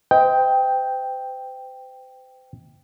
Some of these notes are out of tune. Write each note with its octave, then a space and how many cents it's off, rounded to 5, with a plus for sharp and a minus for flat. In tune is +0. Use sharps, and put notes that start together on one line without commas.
C5 -40 D#5 +30 G5 +0